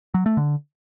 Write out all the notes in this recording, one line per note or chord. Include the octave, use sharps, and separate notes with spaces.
F#3
A3
D3